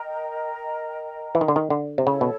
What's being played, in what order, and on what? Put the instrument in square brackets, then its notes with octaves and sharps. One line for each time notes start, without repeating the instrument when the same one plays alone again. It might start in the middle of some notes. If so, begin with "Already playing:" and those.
Already playing: [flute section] A#4 D#5 G5 A#5
[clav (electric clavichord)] E3
D#3
D3
D#3
D3
C3
[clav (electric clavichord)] C#3 [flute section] E4 A4 C#5
[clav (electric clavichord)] B2